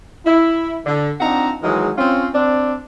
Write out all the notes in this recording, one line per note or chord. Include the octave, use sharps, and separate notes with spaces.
E4
D3
C4 D4 D#4 F4 F#5 A#5
D#3 E3 F#3 G#3
C4 C#4 F4
C4 D4